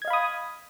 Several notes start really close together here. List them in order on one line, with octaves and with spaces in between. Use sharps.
G#6 D#5 F5 B5 D#6